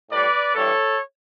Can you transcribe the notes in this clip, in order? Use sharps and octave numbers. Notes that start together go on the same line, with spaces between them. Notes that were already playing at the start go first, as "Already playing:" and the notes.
A2 G3 B4 D5
G2 E3 G3 A4 C#5